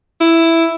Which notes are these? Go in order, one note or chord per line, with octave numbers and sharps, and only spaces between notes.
E4